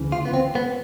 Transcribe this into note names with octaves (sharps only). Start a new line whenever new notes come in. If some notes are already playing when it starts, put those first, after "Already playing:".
Already playing: D2 C#3 E3
F4
B3
C4
B3